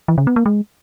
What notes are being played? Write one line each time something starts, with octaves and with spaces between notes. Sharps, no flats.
E3
C#3
B3
A#3
G#3